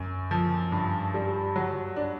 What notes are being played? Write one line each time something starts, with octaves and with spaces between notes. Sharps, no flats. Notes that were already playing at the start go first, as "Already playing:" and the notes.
Already playing: F#2
F3
G2
G3
F#3
D4